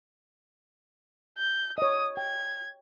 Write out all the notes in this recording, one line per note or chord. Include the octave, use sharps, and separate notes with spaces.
G6
C#5 D#5 D#6
G5 G#6